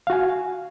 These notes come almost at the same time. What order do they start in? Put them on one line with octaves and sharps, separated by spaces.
F5 F#4 G#5